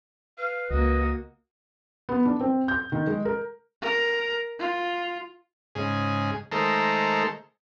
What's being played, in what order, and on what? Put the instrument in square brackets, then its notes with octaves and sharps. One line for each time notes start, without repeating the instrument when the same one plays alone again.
[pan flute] B4 [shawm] F5
[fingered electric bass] C#2 [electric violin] A#3 F#4 [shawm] D#5
[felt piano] B3
D4
C4
G6
D#3
G#3
A#4
[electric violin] A#4
F4
[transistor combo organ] G#2 C#3 G#4
D#3 G#3 A3 A4 A#4 C5